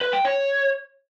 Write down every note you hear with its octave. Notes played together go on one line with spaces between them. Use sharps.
B4
G5
C#5